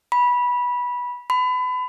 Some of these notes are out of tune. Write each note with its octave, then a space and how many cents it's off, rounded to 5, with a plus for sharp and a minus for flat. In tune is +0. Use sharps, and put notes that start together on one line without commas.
B5 -15
B5 +30